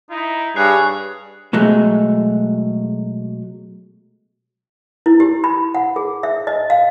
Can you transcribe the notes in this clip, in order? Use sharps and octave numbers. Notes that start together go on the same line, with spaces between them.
D#4 E4
G2 G#4 C#5 F#6 C7
B2 F#3 G#3 A3
E4
G4
B5
F#5
G#4
E5
D#5
F5